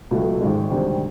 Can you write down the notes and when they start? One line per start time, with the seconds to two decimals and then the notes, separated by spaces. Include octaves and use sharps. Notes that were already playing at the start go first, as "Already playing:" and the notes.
0.11 C#2 B2 F#3 A3
0.41 G#1 G#2 D#3 G#3
0.70 D2 C3 D#3 G3 C4